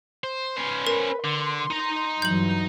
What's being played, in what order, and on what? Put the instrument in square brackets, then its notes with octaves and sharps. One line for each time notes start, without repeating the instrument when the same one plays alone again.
[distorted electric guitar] C5
[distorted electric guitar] C#4 C5 [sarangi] B4
[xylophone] A#4
[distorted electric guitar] D3 [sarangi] C6
[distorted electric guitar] D#4 A#5
[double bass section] G2 E3 F#3 [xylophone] G6 F#7